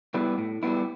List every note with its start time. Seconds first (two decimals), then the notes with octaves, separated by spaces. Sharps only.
0.14 G3 B3 E4
0.38 A2
0.63 G3 B3 E4